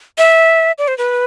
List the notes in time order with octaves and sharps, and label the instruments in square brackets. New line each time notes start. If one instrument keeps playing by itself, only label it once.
[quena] E5
D5
C5
B4